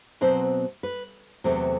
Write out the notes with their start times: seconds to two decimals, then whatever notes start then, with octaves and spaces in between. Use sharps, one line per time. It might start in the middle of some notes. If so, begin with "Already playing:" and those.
0.21 B2 F#3 C4 C5
0.83 B4
1.44 E2 C3 F#3 A3 C4 C5